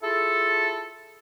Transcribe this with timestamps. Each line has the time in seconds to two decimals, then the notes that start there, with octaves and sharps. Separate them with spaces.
0.02 E4 F4 G#4 A4